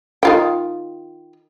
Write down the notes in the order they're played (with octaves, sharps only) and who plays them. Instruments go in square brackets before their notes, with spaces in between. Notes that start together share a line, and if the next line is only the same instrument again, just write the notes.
[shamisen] D#3 F4 G5